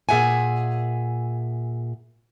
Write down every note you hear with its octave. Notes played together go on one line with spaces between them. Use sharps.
A#2 G#4 E5 F#5 G#5